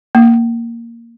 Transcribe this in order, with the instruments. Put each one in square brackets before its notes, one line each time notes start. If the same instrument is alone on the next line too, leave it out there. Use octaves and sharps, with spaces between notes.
[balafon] A#3